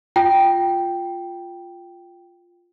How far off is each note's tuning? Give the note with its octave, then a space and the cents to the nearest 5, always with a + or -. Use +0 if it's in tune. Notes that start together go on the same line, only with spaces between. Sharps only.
F4 +0 G5 +0